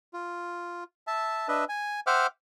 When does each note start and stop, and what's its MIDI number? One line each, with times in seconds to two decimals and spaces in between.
0.13 0.84 65
1.07 1.48 76
1.07 1.48 81
1.48 1.65 62
1.48 1.65 71
1.48 1.65 75
1.48 1.65 76
1.69 2.00 80
2.07 2.27 72
2.07 2.27 76
2.07 2.27 78
2.07 2.27 79
2.07 2.27 86
2.07 2.27 89